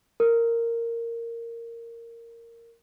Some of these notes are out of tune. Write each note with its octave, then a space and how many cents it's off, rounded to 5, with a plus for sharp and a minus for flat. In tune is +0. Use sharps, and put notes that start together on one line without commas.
A#4 -10